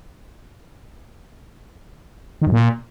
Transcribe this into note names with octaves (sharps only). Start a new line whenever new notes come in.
D#3
F#2
A#2